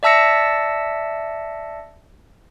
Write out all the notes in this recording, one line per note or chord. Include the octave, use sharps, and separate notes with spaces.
D5 E5 A5 E6 A#6 C#7